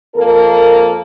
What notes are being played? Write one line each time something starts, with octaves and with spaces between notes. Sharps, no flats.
F2 A#3 A4 A#4